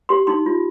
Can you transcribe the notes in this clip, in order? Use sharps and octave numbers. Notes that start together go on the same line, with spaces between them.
G4 C6
D#4 C6
F4